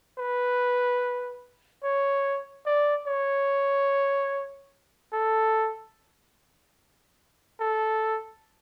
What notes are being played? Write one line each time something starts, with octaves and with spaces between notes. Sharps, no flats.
B4
C#5
D5
C#5
A4
A4